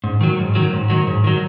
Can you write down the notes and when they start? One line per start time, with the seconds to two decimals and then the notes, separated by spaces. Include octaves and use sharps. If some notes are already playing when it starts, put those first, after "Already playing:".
0.04 G#2
0.21 D#3 F#3
0.39 G#2
0.55 D#3 F#3
0.73 G#2
0.90 D#3 F#3
1.07 G#2
1.24 D#3 F#3